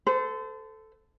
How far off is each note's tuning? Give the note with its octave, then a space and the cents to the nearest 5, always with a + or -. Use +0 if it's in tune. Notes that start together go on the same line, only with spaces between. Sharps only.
A4 +0 C5 -35